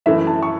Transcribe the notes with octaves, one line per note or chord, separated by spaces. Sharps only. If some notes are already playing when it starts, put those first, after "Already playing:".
F#2 E3 A3 E5
A5
C#6